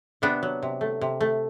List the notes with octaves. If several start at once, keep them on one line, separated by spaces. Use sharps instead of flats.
C3 B3 D4
F#3
C3
A3
C3
A3